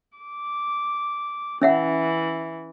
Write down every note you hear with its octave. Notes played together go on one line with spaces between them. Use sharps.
D6
E3 C#4 E5 F#5